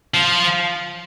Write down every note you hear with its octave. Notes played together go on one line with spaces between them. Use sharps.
F3